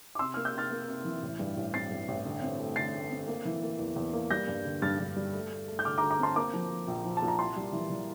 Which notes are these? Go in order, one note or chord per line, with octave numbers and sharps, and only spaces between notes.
D6
C3 C6 E6
A#3 F6
E6 G6
C3 F6 A6
A#3
C3
E3
A1
G2
A1
C4 A6 C7
G2
A1
D3
C4
A3
D3 A6 C7
A3
C4
A#3
E3
A#3
E2
E2
A#3
G3 G6 A#6
G2
D3
G2 F6 A6
G2
G3
A3
A3
A3
G6
D3 D6 F6
D3 A#5 D6
A#5 D6
C4 A5 C6
A#3 A#5 D6
F3
F3
A#1
F3
A5
A#2
A#5
C2 A5 C6
G3
E3
E3